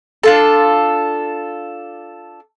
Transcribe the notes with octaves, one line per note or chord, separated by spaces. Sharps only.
D4 F4 A4